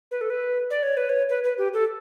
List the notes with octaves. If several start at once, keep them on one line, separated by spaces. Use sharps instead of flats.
B4
A4
B4
D5
C#5
B4
C#5
B4
B4
G4
A4